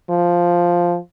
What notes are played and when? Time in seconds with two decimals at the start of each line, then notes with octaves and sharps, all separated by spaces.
0.10 F3